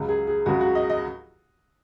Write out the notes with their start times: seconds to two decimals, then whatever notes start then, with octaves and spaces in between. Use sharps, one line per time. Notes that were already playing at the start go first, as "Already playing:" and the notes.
Already playing: C#2 C#3 F#3
0.09 G#4
0.27 G#4
0.46 C#2 C#3 F#3 F#4
0.61 F#4
0.75 D#5
0.90 D#5